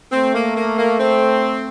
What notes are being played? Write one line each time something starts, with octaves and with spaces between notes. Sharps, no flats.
A3 C4
A#3
A#3
A#3
C4